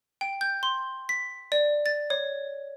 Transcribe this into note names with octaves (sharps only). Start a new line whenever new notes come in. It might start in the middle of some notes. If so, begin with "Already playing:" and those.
G5
G6
C6
B6
D5
A6
C#5